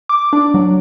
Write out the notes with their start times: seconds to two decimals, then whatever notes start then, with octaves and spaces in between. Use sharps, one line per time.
0.09 D6
0.33 D4
0.54 F#3